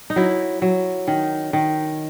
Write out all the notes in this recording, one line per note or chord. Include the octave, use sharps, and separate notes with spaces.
D#4
F#3 E4
F#3
D#3
D#3